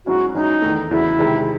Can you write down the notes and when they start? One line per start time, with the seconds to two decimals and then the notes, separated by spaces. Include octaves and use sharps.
0.06 G#2 F#3 C#4 E4 F#4
0.34 G#2 F#3 C#4 D#4 E4
0.62 E2 D#3 A3
0.90 E2 C#3 F#3 E4
1.19 C3 D#3 G#3